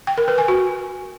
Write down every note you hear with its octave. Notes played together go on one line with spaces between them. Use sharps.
G5
A#4
B4
G#5
F#4